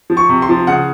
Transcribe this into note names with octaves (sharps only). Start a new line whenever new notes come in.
F3
C#6
C3
C6
F3
C#3 F#5